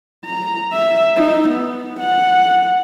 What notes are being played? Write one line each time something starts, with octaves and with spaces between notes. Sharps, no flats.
A#5
E5
D#4
B3
F#5